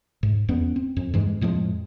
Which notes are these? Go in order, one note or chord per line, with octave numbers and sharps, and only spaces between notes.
G#2
E2 B3 C#4
C4
F2
G2 E3 G#3
F2 A2 F3 G#3